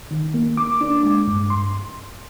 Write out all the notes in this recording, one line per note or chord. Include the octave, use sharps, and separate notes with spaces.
D#3
A#3
A#3 D6
D4
G#3
G2
C6